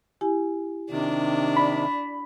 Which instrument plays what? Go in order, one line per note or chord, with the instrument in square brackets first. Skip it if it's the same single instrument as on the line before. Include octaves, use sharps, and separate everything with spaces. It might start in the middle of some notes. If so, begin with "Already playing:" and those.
[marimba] E4 G4 G#5
[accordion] C3 D#3 [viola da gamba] D4
[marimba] D5 [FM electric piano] B5